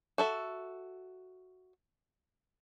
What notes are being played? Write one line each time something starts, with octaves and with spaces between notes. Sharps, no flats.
F#4 A4 E5